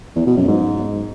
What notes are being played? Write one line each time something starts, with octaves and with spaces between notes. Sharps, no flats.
E2
B2
F#2
G#2